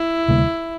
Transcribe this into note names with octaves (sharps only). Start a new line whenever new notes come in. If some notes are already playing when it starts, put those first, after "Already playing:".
Already playing: E4
D2 C3 G3 A#3